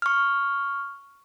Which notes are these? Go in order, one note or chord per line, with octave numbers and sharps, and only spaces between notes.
C#6 F6